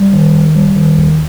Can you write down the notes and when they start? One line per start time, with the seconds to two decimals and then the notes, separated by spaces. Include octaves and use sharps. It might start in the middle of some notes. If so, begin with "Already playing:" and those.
Already playing: G3
0.13 D#3
0.35 D#2
0.55 G3
0.76 D#3
0.97 D#2